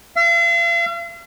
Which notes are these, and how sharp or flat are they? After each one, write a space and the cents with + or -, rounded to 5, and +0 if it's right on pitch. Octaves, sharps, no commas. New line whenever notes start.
F5 -45